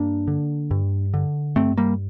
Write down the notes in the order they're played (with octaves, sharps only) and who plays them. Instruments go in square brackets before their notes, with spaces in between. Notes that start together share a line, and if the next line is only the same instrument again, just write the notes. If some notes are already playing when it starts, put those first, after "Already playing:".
Already playing: [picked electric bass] G2 A#3 D4
D3
G2
D3
G2 A3 C4
G3 A#3